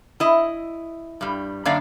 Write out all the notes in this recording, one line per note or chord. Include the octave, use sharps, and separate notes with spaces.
E4 D#5
G2 G3
F#2 D3 A#3 D4 D5 F5